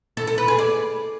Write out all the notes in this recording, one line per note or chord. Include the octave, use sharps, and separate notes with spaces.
A4
A4
B4
G#4
D5